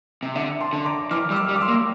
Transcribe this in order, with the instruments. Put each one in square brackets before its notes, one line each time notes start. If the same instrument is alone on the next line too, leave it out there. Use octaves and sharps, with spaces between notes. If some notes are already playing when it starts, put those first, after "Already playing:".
[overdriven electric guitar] C3
[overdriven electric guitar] D3 [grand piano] E5
[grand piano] A5 C6
[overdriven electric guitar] D3 [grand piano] C6
[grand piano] A#5 D6
[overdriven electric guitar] E3 [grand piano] D6 F6
[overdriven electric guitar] G3 [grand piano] E6
[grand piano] D6 F6
[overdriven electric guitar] G3
[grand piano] D6
C6 E6
[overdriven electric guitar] A#3